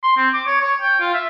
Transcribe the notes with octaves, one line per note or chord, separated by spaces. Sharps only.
C6
C4
D6
C#5
C#5
G5
F4
E5